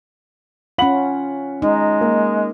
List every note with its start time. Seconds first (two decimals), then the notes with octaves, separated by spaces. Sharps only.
0.78 C#4 F4 F#5 B5 F#7
1.62 G#3 D#4
2.01 A#3